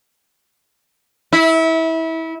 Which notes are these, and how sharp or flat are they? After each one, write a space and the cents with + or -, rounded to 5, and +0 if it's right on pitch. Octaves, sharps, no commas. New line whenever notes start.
E4 -25